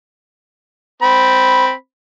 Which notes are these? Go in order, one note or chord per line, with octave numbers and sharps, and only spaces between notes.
C4 B5